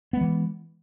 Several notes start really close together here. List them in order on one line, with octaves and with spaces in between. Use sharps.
B3 G#3 E3